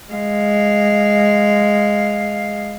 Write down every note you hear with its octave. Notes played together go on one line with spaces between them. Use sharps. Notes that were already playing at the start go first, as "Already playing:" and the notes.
G#3 F5